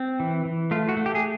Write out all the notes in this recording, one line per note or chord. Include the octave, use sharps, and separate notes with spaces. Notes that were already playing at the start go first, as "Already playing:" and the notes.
Already playing: C4
E3
E3
A3 F4
F#4
A3
G4
G#4